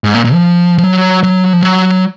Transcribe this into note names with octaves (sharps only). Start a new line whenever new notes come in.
G#2
A#2
A#2
F3
F3
F#3
F#3
F3
F#3